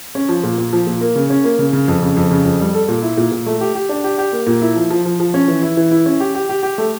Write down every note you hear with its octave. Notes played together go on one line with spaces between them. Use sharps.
C#4
F3
A#2
A#2
F3
A#2
A#3
C#3
C#4
A#3
C#3
C#3
F2
C#3
F2
C#3
F2
G3
A4
A#2
E4
A#2
A#2
A3
G4
G4
D4
G4
G4
A#3
A#2
E4
F3
F3
F3
F3
C#4
E3
E4
E3
E4
C#4
G4
G4
G4
G4
A3